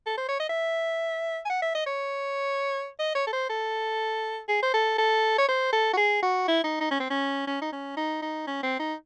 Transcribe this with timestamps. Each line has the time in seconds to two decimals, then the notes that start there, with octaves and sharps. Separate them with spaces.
0.06 A4
0.18 C5
0.28 C#5
0.40 D#5
0.49 E5
1.45 G#5
1.50 F#5
1.62 E5
1.75 D#5
1.86 C#5
2.99 D#5
3.15 C#5
3.27 A4
3.33 C5
3.49 A4
4.48 G#4
4.63 C5
4.73 A4
4.98 A4
5.38 C#5
5.48 C5
5.73 A4
5.93 F#4
5.97 G#4
6.22 F#4
6.48 E4
6.64 D#4
6.80 D#4
6.91 C#4
7.00 C4
7.10 C#4
7.47 C#4
7.62 D#4
7.72 C#4
7.97 D#4
8.22 D#4
8.47 C#4
8.63 C4
8.79 D#4